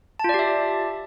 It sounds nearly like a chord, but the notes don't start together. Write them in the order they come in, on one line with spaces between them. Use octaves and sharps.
A5 F4 D5 G4 E5